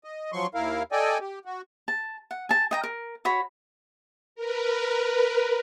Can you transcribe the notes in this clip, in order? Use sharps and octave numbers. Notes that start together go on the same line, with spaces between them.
D#5
F3 F#3 C6 C#6
D#2 E4 A#4 F5
A4 D5 D#5 G5 G#5
G4
F#4
A5
F#5
G#5 A5
D#5 G5 A#5
A#4
F#4 C#5 B5
A#4 B4